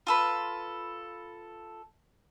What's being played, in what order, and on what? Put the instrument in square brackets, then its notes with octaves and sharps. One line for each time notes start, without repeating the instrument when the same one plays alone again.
[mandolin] F4 A4 B4